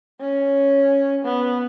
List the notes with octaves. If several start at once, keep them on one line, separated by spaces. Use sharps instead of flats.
C#4
B3